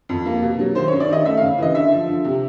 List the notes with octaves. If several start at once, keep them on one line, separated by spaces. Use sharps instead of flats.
F2
A#3
B2
F#3
D#3 C5
C#5
C#4
D5
D#3 D#5
A3 E5
F5
C#3
E3 D#5
D3 E5
F3
D3
C3